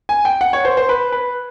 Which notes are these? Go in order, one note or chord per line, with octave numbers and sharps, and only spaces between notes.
G#5
G5
F#5
C#5
C5
C5
B4
B4